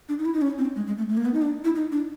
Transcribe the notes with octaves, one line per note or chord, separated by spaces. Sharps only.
D4
D#4
E4
D#4
C#4
C4
G#3
G#3
A3
A3
A#3
B3
D#4
D4
E4
D#4
D4